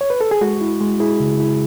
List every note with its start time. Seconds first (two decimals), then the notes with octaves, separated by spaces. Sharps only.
0.01 C#5
0.10 B4
0.21 A4
0.31 G#4
0.41 G#3 F#4
0.61 E4
0.81 G#3
1.00 E4 G#4
1.20 C#3
1.40 E4